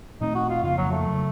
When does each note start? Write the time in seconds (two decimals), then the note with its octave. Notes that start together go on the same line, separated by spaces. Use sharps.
0.21 A#2 A3 C4 D#4
0.35 F#4
0.49 F4
0.63 F2 C#3 F3 A#3 F4
0.78 F#3
0.91 A3
1.06 C#3 F#3